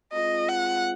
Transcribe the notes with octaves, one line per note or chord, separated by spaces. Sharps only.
G#3 C4 F4 D#5
F#5